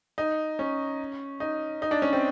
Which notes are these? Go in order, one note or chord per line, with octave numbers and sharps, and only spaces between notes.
D#4
C#4
D#4
D#4
D4
C#4
C4